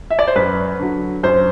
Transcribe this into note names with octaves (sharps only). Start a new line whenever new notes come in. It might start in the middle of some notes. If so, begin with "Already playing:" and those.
E5
D5
C5
F#2 B4
D3 F#3
F#2 C5